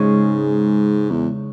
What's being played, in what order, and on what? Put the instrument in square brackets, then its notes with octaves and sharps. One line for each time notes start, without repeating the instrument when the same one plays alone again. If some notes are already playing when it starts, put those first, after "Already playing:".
Already playing: [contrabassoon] G#2 [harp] C#3 G#3 C#4
[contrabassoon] E2